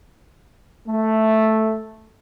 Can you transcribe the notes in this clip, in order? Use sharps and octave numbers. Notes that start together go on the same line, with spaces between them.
A3